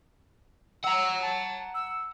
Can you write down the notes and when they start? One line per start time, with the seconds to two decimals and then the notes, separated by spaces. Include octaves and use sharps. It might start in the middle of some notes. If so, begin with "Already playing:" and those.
0.84 F#5 A#5 E6
1.22 A5
1.75 E6